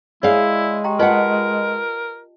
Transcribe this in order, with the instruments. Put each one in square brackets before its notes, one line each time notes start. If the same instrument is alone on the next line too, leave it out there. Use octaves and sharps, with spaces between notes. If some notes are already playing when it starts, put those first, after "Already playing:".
[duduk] G#3 [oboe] E4 [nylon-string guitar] G#4 F5 [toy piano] C#5 D5
[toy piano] G4 G5 A#5
[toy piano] F4 D#5 A5 [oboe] A#4 [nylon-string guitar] B4 F#5